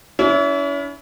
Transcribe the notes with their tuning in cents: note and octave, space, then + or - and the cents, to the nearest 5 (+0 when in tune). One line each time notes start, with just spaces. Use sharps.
C#4 +40 E4 +0